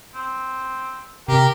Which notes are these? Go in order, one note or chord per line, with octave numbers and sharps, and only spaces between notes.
C4
C3 G4 A#4